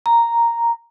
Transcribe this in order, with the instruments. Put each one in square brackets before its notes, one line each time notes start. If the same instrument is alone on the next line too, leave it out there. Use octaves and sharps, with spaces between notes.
[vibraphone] A#5